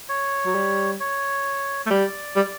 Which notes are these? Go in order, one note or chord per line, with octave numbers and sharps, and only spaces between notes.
C#5
F#3
G3
C#5
A3
G3 D5
G3